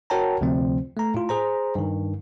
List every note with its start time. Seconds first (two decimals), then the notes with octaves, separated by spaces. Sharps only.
0.10 F#4 A#4 C#5 G5 A5 A#5
0.41 D2 C3 F3 C4
0.97 A3 A#5
1.14 A2 F4
1.29 G#4 C5 A#5
1.75 G2 D#3